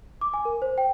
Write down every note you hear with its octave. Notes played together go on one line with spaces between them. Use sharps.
D6
G#5
A#4
C5
G5